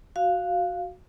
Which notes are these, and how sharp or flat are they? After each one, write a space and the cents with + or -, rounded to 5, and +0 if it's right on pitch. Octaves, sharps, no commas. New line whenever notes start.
F#4 +0 F5 +0